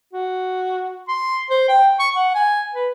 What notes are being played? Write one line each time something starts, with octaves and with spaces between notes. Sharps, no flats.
F#4
C6
C5
G5
C#6
F#5
G#5
B4